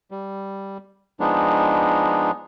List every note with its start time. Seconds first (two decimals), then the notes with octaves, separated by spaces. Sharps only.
0.11 G3
1.20 F3 G#3 B3 D4 D#4